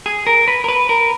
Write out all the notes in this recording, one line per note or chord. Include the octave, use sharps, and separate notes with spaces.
G#4
A#4
B4
A#4
B4
A#4